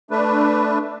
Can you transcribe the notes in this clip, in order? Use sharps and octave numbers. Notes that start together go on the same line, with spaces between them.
A3 D4 B4